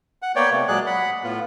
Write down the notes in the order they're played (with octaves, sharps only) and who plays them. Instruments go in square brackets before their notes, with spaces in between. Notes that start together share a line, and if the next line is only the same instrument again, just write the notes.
[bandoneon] F#5
A#3 B3 C#5 D5 G5
C3 A3
A#2 F#3 G#3 G#4 D5 F#6
F#5 B5
A2 B3 F4